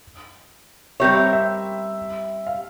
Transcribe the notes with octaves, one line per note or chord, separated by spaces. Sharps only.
G3 C4 G4 A#4 C#5 E5
E5
E5
F5